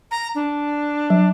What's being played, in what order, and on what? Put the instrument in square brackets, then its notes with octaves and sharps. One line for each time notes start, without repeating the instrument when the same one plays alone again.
[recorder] A#5
D4
[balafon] F#3